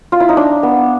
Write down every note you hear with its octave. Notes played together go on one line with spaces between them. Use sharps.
F4
E4
D#4
D4
B3